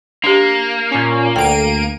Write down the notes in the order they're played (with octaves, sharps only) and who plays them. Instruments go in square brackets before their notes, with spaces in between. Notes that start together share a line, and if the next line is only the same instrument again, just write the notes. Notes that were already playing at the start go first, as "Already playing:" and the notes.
[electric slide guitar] A#3 [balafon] D4 G4
[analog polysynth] A#2 C#4
[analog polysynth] D2 D7 D#7 [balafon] G5